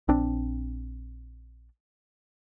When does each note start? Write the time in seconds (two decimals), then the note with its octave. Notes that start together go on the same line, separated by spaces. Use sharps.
0.08 A#1 C4 D4